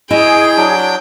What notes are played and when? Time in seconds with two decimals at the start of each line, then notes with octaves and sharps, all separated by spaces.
0.11 E4 G#4 C#5 D#5 G5 G#5
0.57 F#3 D4